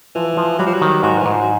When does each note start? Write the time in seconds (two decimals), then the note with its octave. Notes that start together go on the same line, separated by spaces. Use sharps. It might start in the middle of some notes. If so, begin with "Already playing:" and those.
0.15 E3 F3
0.37 F3
0.59 F#3 G3
0.66 F3
0.73 F#3
0.82 D#3
1.03 G#2 F#3
1.18 E3
1.26 G#2
1.32 F3
1.40 F#3